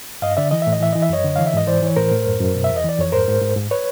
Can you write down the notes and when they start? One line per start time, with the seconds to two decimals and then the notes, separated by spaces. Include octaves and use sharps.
0.22 G2 D#5 F5
0.37 D3 D5 E5
0.51 E3 D#5
0.62 A2 E5
0.72 D#5
0.80 E3 E5
0.93 E3 D#5
1.02 E5
1.09 F#2 C#5 D#5
1.24 D3
1.36 E3 F5
1.46 E5
1.54 G#2 D#5
1.67 E3 C5 D5
1.82 E3 C#5
1.96 A2 A#4 C5
2.11 A2
2.26 F#2
2.40 F#2
2.55 B2
2.64 E5
2.70 E2
2.76 D#5
2.84 E3 D5
2.99 F2 C#5
3.12 G#2 A#4 C5
3.28 G#2
3.42 G#2
3.56 G#2
3.71 B4 C#5